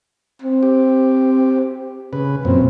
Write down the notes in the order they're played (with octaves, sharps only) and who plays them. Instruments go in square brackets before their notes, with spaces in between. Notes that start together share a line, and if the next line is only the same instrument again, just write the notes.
[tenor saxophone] C4
[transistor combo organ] G4
C#3 B4
[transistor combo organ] F#2 A#2 [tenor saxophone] C4